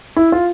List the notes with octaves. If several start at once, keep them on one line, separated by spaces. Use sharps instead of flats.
E4
F4